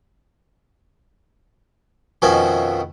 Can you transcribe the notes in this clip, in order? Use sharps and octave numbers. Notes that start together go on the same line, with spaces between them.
F2 B2 D#3 F3 C#4 E5